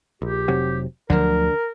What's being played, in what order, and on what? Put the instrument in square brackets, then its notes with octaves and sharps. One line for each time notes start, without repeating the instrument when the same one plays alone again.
[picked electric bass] A#1 [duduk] G4
[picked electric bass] F1 C3 F#3
[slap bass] D2 F3 F#3 [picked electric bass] D3 [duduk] A#4